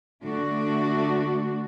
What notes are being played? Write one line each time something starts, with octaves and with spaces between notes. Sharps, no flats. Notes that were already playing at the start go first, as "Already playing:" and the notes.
D3 A3 D4 F#4